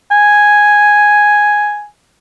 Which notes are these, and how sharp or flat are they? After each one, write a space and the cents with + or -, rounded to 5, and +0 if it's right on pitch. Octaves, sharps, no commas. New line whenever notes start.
G#5 +0